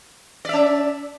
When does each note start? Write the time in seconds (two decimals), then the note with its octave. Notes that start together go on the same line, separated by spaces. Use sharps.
0.45 D5
0.49 E5
0.53 C#4